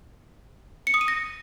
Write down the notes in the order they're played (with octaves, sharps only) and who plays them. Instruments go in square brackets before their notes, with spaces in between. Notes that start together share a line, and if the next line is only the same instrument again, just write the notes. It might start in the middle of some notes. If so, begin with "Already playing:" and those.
[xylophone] C#7
D#6
D#7
A#6